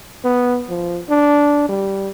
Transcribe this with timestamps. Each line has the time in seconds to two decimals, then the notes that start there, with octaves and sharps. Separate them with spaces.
0.24 B3
0.69 F3
1.09 D4
1.69 G3